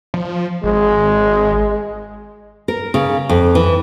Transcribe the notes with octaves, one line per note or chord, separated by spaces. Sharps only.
F3
G#1 G#3
A#4
C#3
F2
E3